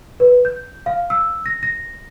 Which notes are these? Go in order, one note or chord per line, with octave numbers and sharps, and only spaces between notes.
B4
G6
F5
E6
A#6
A#6